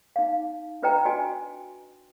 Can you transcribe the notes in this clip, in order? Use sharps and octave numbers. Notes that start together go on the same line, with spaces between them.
D#4 F5
D4 F4 B4 D#5 G5 A#5
F#4 D#5 G#5